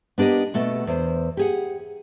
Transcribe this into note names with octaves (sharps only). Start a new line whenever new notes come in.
B3 D4 G4 A#4 D#5
B2 A3 F#4
E2 C5
G4 G#4 F#5